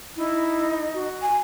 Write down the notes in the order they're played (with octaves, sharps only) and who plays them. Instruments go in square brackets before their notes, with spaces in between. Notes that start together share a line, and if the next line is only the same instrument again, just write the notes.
[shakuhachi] D#4 [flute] E4
[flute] F#4
[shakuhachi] G#5